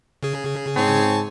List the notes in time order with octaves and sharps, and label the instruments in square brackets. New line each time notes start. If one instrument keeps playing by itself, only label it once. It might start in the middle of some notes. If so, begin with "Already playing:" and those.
[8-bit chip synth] C#3 G#4
[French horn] G#2 [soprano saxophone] C4 [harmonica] C#5 G#5 A5